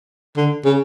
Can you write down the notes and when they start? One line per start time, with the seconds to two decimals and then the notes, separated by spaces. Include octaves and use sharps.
0.37 D3
0.65 C#3